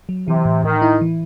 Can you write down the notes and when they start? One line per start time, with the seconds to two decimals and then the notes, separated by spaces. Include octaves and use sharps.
0.09 F#3
0.28 C3 E3
0.45 A2
0.64 A2 D#3
0.82 E4
1.01 E3